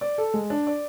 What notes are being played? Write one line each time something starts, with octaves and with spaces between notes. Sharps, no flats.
D5
A4
G#3
D4
D5